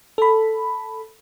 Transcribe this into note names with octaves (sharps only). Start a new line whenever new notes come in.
A4 B5